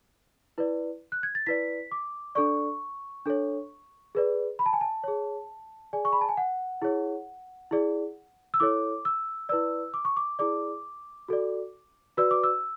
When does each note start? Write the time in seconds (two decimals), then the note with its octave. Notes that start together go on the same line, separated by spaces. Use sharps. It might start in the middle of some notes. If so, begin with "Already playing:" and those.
0.58 E4 B4 D5
1.12 F#6
1.23 G#6
1.35 A6
1.46 E4 B4 D5 B6
1.92 D6
2.35 D4 A4 D5 C#6
3.25 D4 A4 C#5
4.15 G#4 B4 D5
4.59 B5
4.66 A5
4.73 G#5
4.81 A5
5.04 G#4 C#5
5.93 G#4 D5 G#5
6.05 C#6
6.13 B5
6.21 A5
6.29 G#5
6.37 F#5
6.82 E4 G#4 C#5
7.71 E4 G#4 D5
8.54 E6
8.60 E4 A4 C#5 D6
9.05 E6
9.49 E4 B4 D5 E6
9.94 D6
10.05 C#6
10.17 D6
10.39 E4 G#4 D5 D6
11.28 F#4 A4 D5
12.17 F#4 B4 D5 E6
12.31 D6
12.43 E6